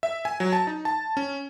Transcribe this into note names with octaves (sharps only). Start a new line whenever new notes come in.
E5
G#5
F#3
A5
D#4
A5
C#4